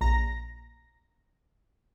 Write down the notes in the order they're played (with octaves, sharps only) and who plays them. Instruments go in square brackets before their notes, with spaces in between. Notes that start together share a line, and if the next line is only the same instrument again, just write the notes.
[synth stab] A#1 A#2 A#5 A#6